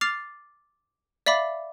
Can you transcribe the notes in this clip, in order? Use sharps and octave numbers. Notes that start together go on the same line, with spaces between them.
D6 F6 A6 C7 F7
D5 E5 F5 B5 D6